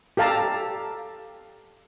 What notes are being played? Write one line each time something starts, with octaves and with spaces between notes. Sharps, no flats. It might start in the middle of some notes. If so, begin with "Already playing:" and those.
G4 A4 F5 A5 A#5